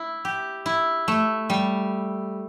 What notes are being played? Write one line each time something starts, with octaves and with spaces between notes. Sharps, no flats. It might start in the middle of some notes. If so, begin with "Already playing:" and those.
Already playing: E4
G4
E4
A3
G3